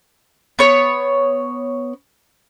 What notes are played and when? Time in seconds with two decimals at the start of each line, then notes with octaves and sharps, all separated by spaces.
0.59 B3 C#5